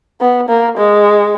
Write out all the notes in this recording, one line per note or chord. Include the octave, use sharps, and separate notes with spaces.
B3
A#3
G#3